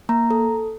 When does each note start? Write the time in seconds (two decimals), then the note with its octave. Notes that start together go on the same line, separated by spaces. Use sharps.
0.09 A#3 A#5
0.31 A4